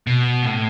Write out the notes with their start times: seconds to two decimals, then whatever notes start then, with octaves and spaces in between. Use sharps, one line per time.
0.07 B2
0.43 A2